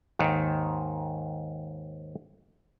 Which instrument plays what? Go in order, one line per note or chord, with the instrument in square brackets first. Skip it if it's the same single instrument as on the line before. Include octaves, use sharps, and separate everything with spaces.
[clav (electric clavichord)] D#2 G#2 D#3